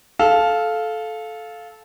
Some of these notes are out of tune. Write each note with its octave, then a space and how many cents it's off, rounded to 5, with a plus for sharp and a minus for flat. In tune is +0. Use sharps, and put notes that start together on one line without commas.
A4 -15 F5 +0